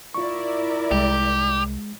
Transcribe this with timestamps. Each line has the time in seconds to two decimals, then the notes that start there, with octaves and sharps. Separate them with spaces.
0.14 E4 F4 A#4 D5 C#6
0.91 C2 G#3 G4